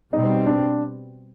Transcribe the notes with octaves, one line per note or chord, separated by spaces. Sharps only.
B2 G3 C4 D#4
D4